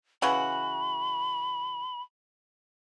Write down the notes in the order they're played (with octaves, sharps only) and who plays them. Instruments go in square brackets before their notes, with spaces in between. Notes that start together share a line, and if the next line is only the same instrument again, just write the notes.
[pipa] C#3 E3 F#4 [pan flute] B5